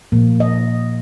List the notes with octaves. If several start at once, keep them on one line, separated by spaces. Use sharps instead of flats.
A#2 F3 A#3
D#5